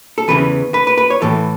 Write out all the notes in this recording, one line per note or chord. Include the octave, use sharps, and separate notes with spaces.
A4
E2 C#3 E3 B4
B4
B4
B4
C#5
A2 E3 A4